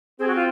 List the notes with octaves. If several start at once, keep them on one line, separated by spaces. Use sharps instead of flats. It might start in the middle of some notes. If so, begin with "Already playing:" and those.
C4 G#4
F#4
F4